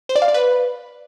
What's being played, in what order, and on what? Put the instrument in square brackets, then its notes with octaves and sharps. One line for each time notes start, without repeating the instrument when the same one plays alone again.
[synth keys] C5
D5
F5
D5
B4